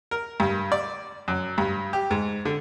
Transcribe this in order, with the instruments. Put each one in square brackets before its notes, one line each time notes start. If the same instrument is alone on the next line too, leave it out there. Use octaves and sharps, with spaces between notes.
[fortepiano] A#4
G2
D5
F#2
G2
G4
G#2
D3